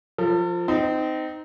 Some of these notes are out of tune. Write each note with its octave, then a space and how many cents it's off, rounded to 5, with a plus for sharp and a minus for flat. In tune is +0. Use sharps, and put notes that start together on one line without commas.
F3 +0 A4 +40
C4 -25 D#4 +0